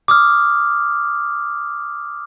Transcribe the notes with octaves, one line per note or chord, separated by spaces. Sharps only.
D6 D#6 F6